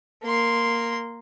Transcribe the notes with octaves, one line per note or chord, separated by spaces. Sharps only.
A#3 C6